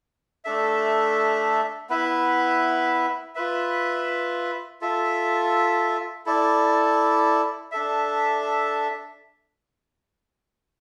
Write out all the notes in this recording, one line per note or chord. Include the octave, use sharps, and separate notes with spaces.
A3 D4 A4 E5
B3 E4 B4 E5
F4 B4 E5
F4 A4 E5
E4 A4 D5
D4 A4 E5